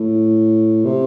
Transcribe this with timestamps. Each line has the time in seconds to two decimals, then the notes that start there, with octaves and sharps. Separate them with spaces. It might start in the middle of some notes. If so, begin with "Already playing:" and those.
Already playing: A2
0.85 C3